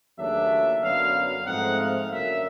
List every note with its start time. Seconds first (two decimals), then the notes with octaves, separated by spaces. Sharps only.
0.18 D#2 C#3 F#3 A3 D4 E5
0.83 F#2 D3 F#3 B3 F5
1.14 F5
1.45 G#2 F3 A3 C4 D#4 F#5
1.79 F5
2.10 F#2 D3 F#3 A#3 E5